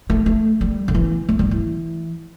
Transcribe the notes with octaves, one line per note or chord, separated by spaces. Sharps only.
A3
A3
G3
D3
E3
A3
G3
E3